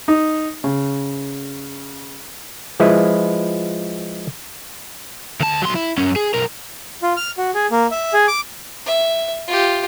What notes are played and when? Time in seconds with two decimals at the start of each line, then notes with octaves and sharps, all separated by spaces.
0.08 D#4
0.64 C#3
2.80 F3 G#3 E4 B4
5.40 D2 A5
5.62 F#3 C6
5.75 E4
5.98 F#2 C#4
6.16 G#4
6.34 B1 A#4
7.03 F4
7.17 F6
7.38 F#4
7.54 G#4
7.71 A#3
7.91 E5
8.13 G#4
8.28 D6
8.86 E5
9.48 F4 G4